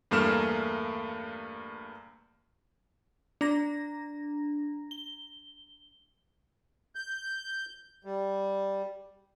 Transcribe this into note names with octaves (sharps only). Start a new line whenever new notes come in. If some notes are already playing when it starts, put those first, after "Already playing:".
E2 G2 A3 A#3 F6 E7
D4 A#5 A#6
G7
G6
G3